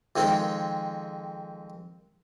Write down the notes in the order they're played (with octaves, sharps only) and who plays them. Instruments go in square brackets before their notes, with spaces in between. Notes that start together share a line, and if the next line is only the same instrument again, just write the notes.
[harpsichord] F2 D#3 G#3 C4